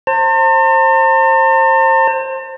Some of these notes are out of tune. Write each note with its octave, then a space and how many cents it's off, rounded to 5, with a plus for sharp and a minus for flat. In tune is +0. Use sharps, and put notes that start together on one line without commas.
C5 +20 A5 +45